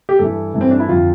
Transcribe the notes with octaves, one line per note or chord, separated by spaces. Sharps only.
G4
G2 E3 A4
G2 E3
C4
D4
E4
F2 D3 F3 F4